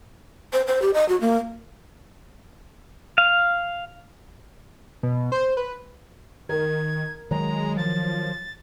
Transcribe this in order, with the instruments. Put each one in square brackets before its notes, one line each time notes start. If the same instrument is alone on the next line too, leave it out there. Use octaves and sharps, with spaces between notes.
[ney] C5
C5
G4
D#5
F#4
A#3
[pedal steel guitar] F5
[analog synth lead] B2
C5
B4
[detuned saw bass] D#3 [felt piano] A#4 [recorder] G#6
[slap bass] D#3 F#3 [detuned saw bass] G#3 [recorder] A#5
[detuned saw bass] F3 [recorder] A6